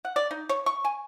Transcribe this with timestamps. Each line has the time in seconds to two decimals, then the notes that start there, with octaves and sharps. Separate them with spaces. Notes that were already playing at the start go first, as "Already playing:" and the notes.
0.05 F#5
0.16 D5
0.31 D#4
0.49 C#5
0.66 C#6
0.85 G#5